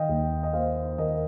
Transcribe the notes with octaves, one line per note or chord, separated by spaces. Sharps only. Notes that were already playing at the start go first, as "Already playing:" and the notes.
Already playing: D#3 D#5 F5 G5
D#2
D#5
A#3 C5 F5
D#2 A#4 D#5